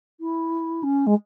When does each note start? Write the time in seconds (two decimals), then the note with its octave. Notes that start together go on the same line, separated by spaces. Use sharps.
0.20 E4
0.83 C#4
1.06 G#3